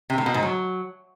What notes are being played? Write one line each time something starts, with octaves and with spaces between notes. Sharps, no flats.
C3
A2
B2
G#2
F#3